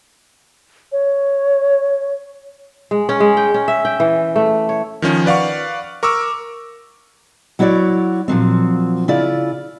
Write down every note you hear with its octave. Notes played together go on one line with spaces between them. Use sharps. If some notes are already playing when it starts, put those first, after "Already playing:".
C#5
G#3
C#4
G#3
G5
C#4
E5
G5
E3
A3
C#5
D#3 F3 C#4
B4 D5 F5 F#5 C#6
A#4 C#6 D6 E6
F#3 E4 F#4 C#5 D5
A#2 F3 F#3 C4
C#3 E4 F4 D5